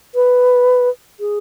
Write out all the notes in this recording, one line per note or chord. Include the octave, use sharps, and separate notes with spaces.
B4
G#4